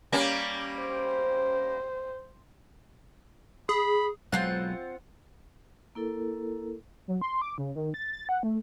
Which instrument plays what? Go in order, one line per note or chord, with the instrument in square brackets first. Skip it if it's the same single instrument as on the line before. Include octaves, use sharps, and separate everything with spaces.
[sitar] G3 A#3 C#4
[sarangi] C5
[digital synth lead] G#4 [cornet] B5
[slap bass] B1 F#3 G#3 [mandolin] C4 F4 F#5
[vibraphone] A#3 E4 A4 A#4
[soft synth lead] F#3
C6
D6
C#3
D#3
A6
A6
F#5
A3